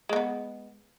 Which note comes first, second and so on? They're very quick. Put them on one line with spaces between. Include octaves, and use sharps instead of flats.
G#3 A#3 B3